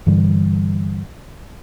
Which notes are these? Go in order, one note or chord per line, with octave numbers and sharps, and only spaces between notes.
G2 D3 E3 G3